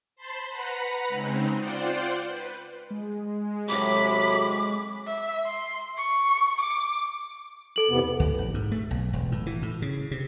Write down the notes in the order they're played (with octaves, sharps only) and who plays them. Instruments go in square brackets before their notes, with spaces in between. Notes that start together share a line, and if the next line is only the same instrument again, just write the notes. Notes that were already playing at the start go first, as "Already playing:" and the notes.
[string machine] C5 A5 B5 C6
B4 F#5 A#5 B5
C#3 G#3 C4 D#4
F4 C5 D5 F#5 G5
B4
[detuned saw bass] G#3
[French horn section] A2 C3 F#3 [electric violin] B5 B6 [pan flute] D6
[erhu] E5
C6
C#6
D6
[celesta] A4 F#7
[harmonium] E2 C3 B3
[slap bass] D2
A#1
G#2
A3
B1
E1
A2
E3
A2
C#3
C3